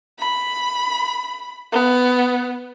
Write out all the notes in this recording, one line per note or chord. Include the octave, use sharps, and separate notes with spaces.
B5
B3